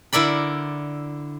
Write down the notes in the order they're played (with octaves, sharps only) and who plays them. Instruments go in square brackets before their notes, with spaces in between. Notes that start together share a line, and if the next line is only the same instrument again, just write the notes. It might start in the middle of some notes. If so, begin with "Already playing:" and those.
[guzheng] D3 E4 A#4 D5 B5